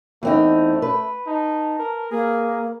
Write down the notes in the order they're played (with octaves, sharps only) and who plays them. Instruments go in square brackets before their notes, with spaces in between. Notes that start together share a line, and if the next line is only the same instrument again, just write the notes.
[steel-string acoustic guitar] E2 C4 D#4 [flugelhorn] A3
[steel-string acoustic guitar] B4
[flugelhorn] D#4 [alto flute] A5
[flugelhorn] A#4
[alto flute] A#3 [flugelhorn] G#4